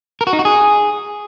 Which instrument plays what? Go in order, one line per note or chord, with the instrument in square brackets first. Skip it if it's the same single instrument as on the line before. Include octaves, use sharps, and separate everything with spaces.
[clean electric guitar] A#4
F#4
D#4
F#4
G#4